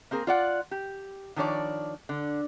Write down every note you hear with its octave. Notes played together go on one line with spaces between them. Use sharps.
A#3 C4 G#4 A#4
F4 D5 F#5
G4
D#3 F3 D4 C#5 D5
D3